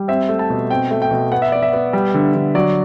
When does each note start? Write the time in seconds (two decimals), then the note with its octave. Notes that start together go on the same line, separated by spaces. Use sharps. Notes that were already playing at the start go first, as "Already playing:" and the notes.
Already playing: G3
0.08 C4 E5
0.29 A3
0.39 A5
0.50 B2
0.70 C4 G5
0.91 A3
1.02 G5
1.11 B2
1.32 B3 F#5
1.42 E5
1.52 B3 D5
1.62 E5
1.73 B3
1.93 G3
2.14 D3
2.35 D3
2.55 F#3 D5